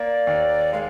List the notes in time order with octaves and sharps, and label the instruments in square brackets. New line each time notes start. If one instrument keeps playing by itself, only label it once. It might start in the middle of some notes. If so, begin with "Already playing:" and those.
Already playing: [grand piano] A#3 [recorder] D5
[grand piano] D#2
[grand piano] G#3 [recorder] F5